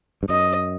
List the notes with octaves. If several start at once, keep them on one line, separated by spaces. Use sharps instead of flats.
G2
F#2 D#5